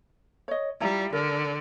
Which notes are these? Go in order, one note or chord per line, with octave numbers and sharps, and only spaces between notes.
C#5 D#5
G3 E4 F4 A#5
D3 A#4